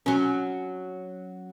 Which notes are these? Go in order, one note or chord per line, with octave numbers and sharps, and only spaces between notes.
F#3 C#4